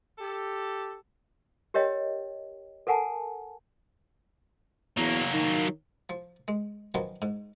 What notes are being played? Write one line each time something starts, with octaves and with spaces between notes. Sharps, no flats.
G4 A4
G4 A#4 C#5 D#5 G5
A4 A#4 F#5 G#5 A5
E2 F#3 A#3
D#3
F3
G#3
D#3 F3 F#3 B3 C#4
G#2